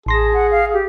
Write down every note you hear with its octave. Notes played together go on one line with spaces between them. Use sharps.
A1 G#4 A5 C6 A#6
F#5
F5
G4